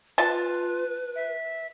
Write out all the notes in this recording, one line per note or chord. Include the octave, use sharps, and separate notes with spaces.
F4 B4 A5
E5